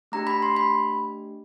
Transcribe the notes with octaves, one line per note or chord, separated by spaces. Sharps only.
A3 D4 G4 A#5
B5
C6
B5